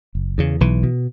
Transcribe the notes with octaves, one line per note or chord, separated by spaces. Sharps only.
F#1
E2 C#3
B1 E3
B2